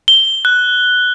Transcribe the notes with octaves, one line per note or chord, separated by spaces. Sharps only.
G7
F#6